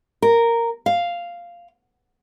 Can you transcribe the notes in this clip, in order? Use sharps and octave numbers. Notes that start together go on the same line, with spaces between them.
A#4
F5